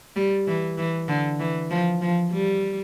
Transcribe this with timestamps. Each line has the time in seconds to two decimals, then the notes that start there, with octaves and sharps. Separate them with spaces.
0.16 G3
0.47 E3
0.78 E3
1.08 D3
1.40 E3
1.71 F3
2.02 F3
2.32 G3